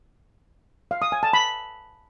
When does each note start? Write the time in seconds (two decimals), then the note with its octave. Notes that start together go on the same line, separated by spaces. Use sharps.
0.91 F5
1.02 D#6
1.12 G#5
1.23 A5
1.33 B5